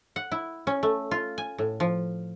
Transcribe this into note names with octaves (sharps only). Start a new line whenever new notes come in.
F#5
E4
C#4
A3
F4
G#5
A2
F3